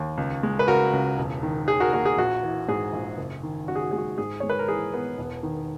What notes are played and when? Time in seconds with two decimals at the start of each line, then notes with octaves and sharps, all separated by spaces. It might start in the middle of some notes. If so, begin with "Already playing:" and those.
Already playing: D#2
0.17 C#2
0.43 G#3
0.59 B4
0.68 C#3 F#4 A#4
0.93 C#2
1.18 E1
1.43 D#3
1.67 D#2 G#4
1.80 F#4 A#4
1.93 A#3 F#4 A#4
2.06 G#4
2.18 A#1 F#4
2.43 E3
2.68 G#2 G#4
2.93 A#1
3.18 F#1
3.43 D#3
3.68 F#2 F#4
3.76 G#4
3.83 F#4
3.91 G#3 G#4
3.98 F#4
4.18 G#2 G#4
4.40 G#3 C#5
4.50 B4
4.59 A#4
4.68 E3 G#4
4.94 B3
5.18 E1
5.43 D#3